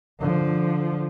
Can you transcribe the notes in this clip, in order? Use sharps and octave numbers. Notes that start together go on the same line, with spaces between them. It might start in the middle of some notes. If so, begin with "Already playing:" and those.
D3 F3